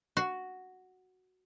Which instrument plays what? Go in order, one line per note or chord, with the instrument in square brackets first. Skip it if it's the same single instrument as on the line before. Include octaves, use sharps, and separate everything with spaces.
[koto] F#4